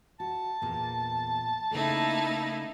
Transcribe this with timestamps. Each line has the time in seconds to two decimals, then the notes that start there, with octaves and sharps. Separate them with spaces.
0.20 F#4 A5
0.62 E2 A#2 A#3
1.71 C#3 A3 A#3 D#4 E4 A4